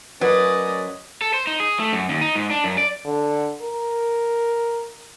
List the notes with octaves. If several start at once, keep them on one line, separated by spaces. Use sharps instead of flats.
F#3 C#4 A#4 B4 D5 D#5
A4
C5
D#4
G#4
A3
F#2
D#2
D#4
G#2
D4
F#2
D5
D3
A#4